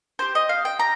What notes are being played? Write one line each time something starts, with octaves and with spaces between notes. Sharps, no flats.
C4 G4 C5
D#5
F5
G5
G4 A#5